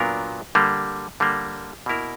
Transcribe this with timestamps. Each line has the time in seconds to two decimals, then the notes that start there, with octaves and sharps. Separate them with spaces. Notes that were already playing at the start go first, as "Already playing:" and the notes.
Already playing: A#2 F#3 B3 D4 A#4
0.55 D3 G3 A#3
1.20 D3 G3 A#3
1.86 B2 A#3 E4 A#4